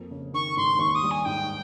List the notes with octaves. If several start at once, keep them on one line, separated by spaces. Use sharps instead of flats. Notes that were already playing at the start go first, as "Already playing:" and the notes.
Already playing: F2 A#3
C#3
D#3 C#6
G#2 C6
D#2 C#6
D#6
G3
G#5
G#2 G5